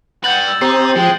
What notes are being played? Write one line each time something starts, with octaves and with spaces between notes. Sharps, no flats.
G3 B4 F#5 G6 A6 F#7
E6
C4 D#4 G4 C7
F3 G#3 G5